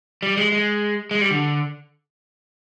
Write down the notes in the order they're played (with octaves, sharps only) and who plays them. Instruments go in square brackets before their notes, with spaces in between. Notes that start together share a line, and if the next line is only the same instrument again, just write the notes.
[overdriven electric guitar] G3
G#3
G#3
G#3
G3
D3